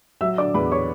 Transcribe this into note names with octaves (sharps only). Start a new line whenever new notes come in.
F#3 E5 E6
D3 D5 D6
E2 B4 B5
C#5 C#6